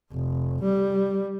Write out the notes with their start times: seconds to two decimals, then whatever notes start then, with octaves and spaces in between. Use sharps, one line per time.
0.12 F1
0.62 G3